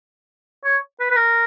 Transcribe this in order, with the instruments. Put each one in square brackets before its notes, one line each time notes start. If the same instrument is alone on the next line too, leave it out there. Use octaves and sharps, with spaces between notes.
[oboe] C#5
B4
B4
A#4